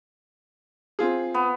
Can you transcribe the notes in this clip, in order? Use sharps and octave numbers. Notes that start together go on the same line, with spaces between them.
C4 F4 G#4
B3